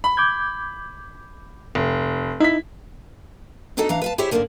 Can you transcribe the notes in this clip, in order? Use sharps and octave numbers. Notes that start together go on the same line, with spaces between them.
B5
D6 G6 G#6
F1
D#4 E4 B6
B3 D4 D#4 F#4 A4 D#5
E3 D4 F5 A#5
B4 F5 A5
E4 G4 G#4 C5 C#5 E5
G#2 D3 D#3 A3 A#3 D4